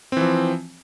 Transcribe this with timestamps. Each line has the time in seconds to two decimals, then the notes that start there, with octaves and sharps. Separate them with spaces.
0.12 C4
0.17 E3
0.21 F3